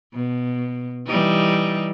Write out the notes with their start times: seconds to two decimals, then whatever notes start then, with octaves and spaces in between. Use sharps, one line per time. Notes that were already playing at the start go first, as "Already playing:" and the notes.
0.13 B2
1.07 E3 G3 D#4